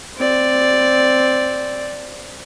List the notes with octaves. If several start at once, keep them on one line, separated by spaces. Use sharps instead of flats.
C4 D5